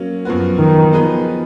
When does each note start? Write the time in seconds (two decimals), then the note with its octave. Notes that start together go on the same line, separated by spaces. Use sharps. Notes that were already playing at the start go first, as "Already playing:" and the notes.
Already playing: F#3 A#3 C#4
0.25 F#2 F3 B3 F#4
0.59 D#3
0.92 F3 B3 D#4 G#4 B4